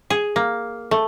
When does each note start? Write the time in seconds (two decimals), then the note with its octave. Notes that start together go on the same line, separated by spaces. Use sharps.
0.10 G#4
0.36 A#3
0.91 A3